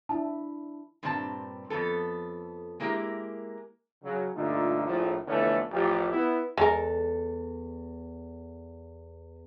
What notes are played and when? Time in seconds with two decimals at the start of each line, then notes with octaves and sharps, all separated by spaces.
0.09 D4 E4 A5
1.03 G2 A#2 G3 C4 F#4 A5
1.70 F2 F3 B3 A4
2.80 G#3 A#3 E4 G4 A#4
4.03 C#3 F#3
4.34 G2 A#2 D3 A3 D#4 F4
4.86 A#1 A2 F3
5.28 F2 D3 E3 A3 B3 C#4
5.71 A1 F3 G4
6.11 B3 E4
6.57 E2 G#3 A4 A#4